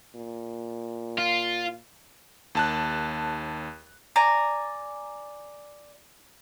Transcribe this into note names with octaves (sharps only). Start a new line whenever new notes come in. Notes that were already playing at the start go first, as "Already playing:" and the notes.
A#2
F4
D#2 A5 F#6
D5 G#5 A#5